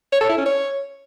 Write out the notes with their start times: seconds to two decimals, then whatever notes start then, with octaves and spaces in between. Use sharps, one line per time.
0.12 C#5
0.21 A4
0.29 E4
0.38 C#4
0.46 C#5